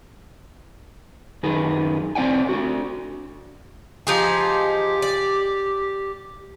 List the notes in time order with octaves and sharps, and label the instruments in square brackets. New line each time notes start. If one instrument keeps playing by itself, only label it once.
[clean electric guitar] F#2 D#3 G#4 B4
C2 C4 D5 F#5 G#5
D4 F#4
[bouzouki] F3 D#4 G#4 [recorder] G4
[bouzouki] D5